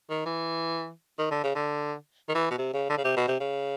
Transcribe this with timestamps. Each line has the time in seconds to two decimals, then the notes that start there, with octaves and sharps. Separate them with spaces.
0.10 D#3
0.25 E3
1.19 D#3
1.31 D3
1.44 C#3
1.55 D3
2.29 D#3
2.35 E3
2.51 B2
2.58 C3
2.74 C#3
2.89 D3
2.98 C#3
3.04 C3
3.17 B2
3.28 C3
3.40 C#3